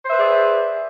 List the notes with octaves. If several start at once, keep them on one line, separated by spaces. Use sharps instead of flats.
G#4 B4 C5 D5 E5